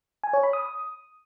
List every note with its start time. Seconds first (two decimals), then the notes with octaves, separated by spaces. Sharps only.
0.24 G#5
0.33 C#5
0.43 B5
0.53 D#6